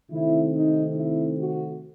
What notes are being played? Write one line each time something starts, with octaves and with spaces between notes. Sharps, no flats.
C3 D#3 A3 C4 E4
D#4
E4
F#4